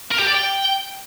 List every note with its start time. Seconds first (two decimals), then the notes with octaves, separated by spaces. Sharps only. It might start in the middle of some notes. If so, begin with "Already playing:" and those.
0.12 A#4
0.19 G4
0.27 D5
0.34 G5